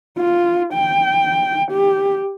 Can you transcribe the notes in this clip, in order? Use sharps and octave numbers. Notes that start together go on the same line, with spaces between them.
F4
G5
G4